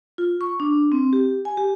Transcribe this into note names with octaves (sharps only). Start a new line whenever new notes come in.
F4
C#6
D4
C4
G4
G#5
G4